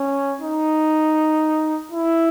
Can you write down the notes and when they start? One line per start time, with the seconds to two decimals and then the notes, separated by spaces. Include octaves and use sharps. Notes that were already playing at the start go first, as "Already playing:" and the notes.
Already playing: C#4
0.41 D#4
1.92 E4